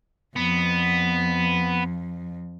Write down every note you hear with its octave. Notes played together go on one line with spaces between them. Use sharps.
F2 B3